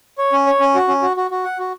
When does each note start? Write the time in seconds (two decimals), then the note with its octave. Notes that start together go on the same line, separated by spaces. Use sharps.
0.18 C#5
0.33 C#4
0.47 C#5
0.60 C#4
0.75 F#4
0.88 C#4
1.02 F#4
1.17 F#4
1.31 F#4
1.44 F#5
1.59 F#4